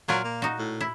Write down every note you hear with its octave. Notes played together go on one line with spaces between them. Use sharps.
A#2 F#3 F4 A#4
A#3
D#4 F#4
A2
E4